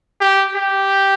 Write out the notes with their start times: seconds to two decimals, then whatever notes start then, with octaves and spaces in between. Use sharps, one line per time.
0.21 G4
0.56 G4